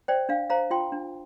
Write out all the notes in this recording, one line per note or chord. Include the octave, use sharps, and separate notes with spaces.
C5 D5 G5
D4 F5
C5 F5 A#5
F4 G5 C6
D4